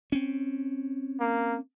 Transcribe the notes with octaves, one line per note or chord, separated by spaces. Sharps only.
C4 C#4
A#3